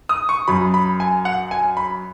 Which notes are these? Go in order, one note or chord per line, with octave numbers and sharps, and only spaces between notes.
D#6
C#6
F#2 F#3 B5
B5
G#5
F#5
G#5
B5